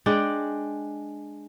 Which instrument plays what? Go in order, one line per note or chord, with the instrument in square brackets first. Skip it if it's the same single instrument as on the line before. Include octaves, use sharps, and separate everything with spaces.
[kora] G#3 D4 D5 G5